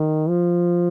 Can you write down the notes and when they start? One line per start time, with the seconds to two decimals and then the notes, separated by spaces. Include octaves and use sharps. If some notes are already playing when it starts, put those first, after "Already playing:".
Already playing: D#3
0.29 F3